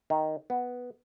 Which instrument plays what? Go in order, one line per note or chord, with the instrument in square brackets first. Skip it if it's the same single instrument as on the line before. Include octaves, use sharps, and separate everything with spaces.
[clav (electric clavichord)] D#3
B3